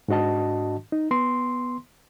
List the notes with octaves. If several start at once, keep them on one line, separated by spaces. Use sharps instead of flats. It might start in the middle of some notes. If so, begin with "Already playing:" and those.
G#2 D4 F#4 D#5 A5
D#4
B3 C6